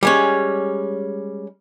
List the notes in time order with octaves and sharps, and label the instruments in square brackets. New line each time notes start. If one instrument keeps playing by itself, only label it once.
[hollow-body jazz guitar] G3 G#3 C#4